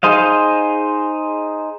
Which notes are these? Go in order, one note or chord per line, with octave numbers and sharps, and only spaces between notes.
D#4 G#4 C5 D#5 F5